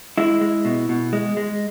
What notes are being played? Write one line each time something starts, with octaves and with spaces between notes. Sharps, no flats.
G#3 E4
G#3
B2
B2
G#3
G#3